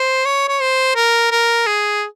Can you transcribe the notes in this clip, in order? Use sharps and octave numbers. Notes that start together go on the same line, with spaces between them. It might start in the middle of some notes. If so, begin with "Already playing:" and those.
Already playing: C5
C#5
C#5
C5
A#4
A#4
G#4